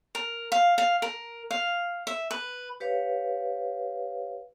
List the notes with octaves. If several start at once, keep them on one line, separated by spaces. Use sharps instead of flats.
A#4
F5
F5
A#4
F5
E5
B4
G4 B4 C#5 F5